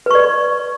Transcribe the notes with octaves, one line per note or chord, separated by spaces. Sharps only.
B4 D5 C#6